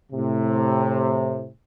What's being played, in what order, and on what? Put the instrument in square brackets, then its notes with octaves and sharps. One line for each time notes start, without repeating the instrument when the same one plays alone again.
[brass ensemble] A2 C3